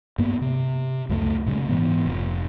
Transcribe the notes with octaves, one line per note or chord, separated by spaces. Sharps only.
G2 A#3 B3
C3
C#2 F#2 G3 A3
A#2 C#3 G#3
G#2 E3 B3
F1